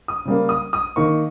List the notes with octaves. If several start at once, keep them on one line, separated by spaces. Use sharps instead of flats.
D#6
C#3 G3 A#3
D#6
D#6
D#3 A#3 D#4 C#6